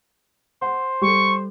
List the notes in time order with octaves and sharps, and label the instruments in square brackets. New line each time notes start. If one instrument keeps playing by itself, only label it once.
[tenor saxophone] C5 [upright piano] F#5
[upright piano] G3 A4 [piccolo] C#6